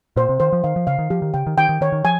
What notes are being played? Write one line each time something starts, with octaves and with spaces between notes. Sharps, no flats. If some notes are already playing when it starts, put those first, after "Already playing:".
A#2 C5
C3
D#3 C5
F3
D#3 F5
F3
C#3 F5
D#3
F3 G4
D#3
C#3 G5
D#3
D#3 G5
D#3
D#3 C#5
D#3
F3 G#5